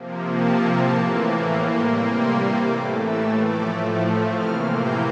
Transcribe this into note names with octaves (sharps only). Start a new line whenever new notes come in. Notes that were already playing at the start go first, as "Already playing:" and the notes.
Already playing: C3 F3 A#3
A5
A2 E3 A#3 A5
C3 G3 A#3 C6
C6
A2 E3 A3 D6
E6
A2 F3 A3 D6
C3 E3 A#3 F6
G6